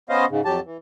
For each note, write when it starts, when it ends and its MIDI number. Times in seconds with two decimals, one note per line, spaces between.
0.09 0.25 59
0.09 0.25 61
0.09 0.25 72
0.09 0.25 75
0.09 0.25 77
0.30 0.41 44
0.30 0.41 49
0.45 0.60 41
0.45 0.60 54
0.45 0.60 67
0.45 0.60 81
0.65 0.77 52